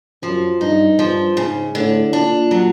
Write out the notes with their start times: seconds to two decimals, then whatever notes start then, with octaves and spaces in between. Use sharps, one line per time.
0.23 F#2 F3
0.61 G2 D#4
0.99 G2 F3
1.37 G#2 C#3
1.75 A2 D3
2.13 A#2 D4
2.51 F#3